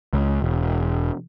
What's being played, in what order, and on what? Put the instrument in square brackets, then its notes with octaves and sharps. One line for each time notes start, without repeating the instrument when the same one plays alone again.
[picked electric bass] C#2
E1